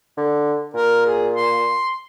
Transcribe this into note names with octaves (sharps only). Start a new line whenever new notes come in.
D3
A#2 A#4
G#4
C6